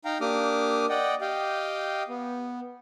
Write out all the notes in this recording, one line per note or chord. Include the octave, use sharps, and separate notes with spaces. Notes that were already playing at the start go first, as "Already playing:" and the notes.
D#4 F5 G5 A#5
A#3 D4 G4 D6 D#6 F6
D5 D#5 F#5 G5
G4 D#5 F5 G5
B3